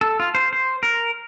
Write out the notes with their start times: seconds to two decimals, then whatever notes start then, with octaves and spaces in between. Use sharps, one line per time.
0.01 A4
0.20 F4
0.35 C5
0.53 C5
0.83 A#4